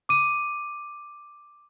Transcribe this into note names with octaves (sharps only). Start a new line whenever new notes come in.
D6 D#7